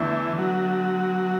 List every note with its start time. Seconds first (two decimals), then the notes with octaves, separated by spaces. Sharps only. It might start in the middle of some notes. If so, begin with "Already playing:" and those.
Already playing: E2 D3 E3 A3 D4
0.38 F#3